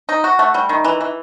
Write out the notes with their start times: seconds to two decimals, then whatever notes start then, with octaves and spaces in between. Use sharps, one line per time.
0.09 D#4
0.24 F#4
0.39 A3
0.54 G3
0.69 D#3
0.84 E3
1.01 E3